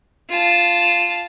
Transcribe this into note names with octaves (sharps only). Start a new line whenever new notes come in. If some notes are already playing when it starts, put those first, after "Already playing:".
F4 A5